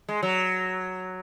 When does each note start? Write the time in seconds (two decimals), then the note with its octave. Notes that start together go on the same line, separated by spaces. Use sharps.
0.09 G#3
0.23 F#3